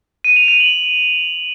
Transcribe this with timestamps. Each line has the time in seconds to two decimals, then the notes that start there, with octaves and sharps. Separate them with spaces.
0.24 D#7
0.36 F7
0.48 D#7
0.60 F#7